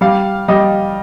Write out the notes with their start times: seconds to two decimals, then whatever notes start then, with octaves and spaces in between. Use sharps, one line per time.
0.01 G3 F5
0.48 G3 D#5